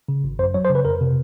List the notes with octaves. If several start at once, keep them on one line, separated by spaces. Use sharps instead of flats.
C#3
G#1
F#2 C5
F#3 C#5
C5
C#3
B4
F2 A#4
C3